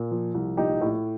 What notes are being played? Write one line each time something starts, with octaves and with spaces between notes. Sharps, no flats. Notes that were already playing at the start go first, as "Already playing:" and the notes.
Already playing: A#2
F3
C2
A#1 D#4 G4
A2